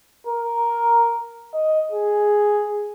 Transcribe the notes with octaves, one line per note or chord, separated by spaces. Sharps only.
A#4
D#5
G#4